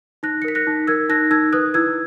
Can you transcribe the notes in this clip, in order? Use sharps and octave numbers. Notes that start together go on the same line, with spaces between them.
D#4 F#6 A#6
C#7
A#4 B6
F#6 A#6
D#4
A#4 E6 G#6
D#4 F#6 A#6
D#4 E6 G#6
B4 D#6 F#6
E4 E6 G#6